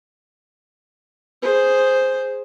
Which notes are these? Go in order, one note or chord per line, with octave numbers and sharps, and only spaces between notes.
G#4 C5